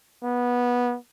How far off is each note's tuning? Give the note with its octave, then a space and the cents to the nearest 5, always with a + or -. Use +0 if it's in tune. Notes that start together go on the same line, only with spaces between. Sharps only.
B3 -15